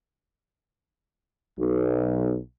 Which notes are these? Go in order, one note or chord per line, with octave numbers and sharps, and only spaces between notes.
B1